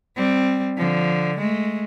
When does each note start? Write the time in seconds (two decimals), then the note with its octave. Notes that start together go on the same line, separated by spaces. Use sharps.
0.16 G3 C4
0.77 D3 F3
1.37 G#3 A3